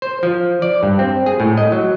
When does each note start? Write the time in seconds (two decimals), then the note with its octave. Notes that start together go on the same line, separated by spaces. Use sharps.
0.02 C5
0.23 F3
0.62 D5
0.83 G2
0.99 C4
1.26 G#4
1.40 A2
1.57 D#5
1.72 F#3